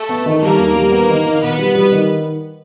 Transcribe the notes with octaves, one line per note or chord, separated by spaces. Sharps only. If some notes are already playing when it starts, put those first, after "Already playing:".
Already playing: A3 A4
B3
D#3
G3 A#3 A#4
D#2
G3
B3
D#3
D#3
B2 B3 B4
G3
G3
D#3